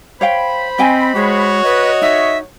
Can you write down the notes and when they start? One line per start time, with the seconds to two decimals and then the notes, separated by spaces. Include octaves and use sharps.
0.21 C5 C#5 F5 G5 B5
0.78 C4 D#5 G5 G#5
1.15 G#3 F#4 C#5
1.64 B4 D#5
2.02 D#4 E5